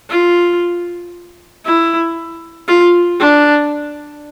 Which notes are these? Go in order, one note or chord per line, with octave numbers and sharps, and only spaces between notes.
F4
E4
F4
D4